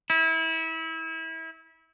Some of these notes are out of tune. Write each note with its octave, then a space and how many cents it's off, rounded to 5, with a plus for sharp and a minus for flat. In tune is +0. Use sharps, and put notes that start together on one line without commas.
E4 -25